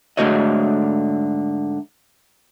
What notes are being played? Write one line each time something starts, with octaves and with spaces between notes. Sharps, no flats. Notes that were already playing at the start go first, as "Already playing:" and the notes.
G#2 D3 A3 F#4 C#5 D#5